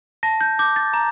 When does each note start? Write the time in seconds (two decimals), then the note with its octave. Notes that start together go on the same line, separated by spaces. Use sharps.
0.23 A5 A#6
0.41 G6
0.59 D6 G6
0.76 A6
0.94 A#5